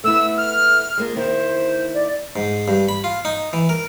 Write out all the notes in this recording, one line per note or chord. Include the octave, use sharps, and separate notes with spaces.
A3 B3 E4 E6
F6
G#3 A#3 F4
D#3 A#3 E4 C5
D5
G#2
G2
B5
F4
D#4
E3
A#4